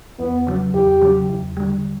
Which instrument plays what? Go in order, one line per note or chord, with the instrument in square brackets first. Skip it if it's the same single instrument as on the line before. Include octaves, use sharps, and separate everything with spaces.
[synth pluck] E2 [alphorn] B3
[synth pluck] C#3 F#3
[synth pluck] E2 [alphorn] G4
[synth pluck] C#3 F#3
E2
D3 G3